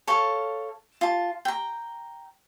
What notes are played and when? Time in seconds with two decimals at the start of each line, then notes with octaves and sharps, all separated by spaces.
0.07 A4 C#5 F5 A5
1.01 F4 A5
1.45 G5 A#5